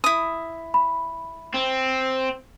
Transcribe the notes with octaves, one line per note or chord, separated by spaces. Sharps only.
E4 D#6
B5
C4